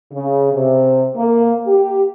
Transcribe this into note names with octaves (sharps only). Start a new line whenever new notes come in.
C#3
C3
A#3
G4